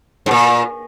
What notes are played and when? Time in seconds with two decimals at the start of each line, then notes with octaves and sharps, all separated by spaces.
0.26 G#2
0.31 A#2